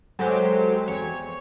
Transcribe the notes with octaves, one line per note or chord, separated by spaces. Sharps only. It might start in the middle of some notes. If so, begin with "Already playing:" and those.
F#3 G#3 G4 A4 C5
E2 C#5